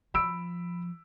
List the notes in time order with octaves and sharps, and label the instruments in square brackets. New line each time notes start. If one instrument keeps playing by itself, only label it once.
[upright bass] F3 [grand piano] B5 E6 D7